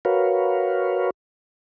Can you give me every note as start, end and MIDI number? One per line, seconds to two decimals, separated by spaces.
0.05 1.10 66
0.05 1.10 70
0.05 1.10 71
0.05 1.10 73
0.05 1.10 77